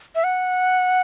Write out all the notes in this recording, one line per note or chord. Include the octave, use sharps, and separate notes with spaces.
E5
F#5